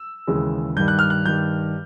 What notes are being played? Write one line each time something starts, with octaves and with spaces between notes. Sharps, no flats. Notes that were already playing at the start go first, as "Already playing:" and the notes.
Already playing: E6
D#2 C#3 E3 G#3
G2 D#3 G3 G6
F#6
F6
F#6
G2 D#3 G3 G6